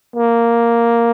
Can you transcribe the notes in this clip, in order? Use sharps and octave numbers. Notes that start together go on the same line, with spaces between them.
A#3